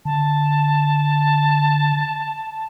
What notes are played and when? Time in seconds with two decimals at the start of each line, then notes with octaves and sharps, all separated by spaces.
0.05 D3 A5